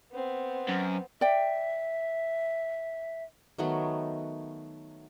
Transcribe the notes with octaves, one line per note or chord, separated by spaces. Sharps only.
B3 C4
F#2
D5 E5 G5
D#3 F#3 A3 B3